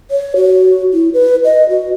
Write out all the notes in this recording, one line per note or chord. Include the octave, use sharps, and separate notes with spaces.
C#5
F#4
E4
B4
D#5
F#4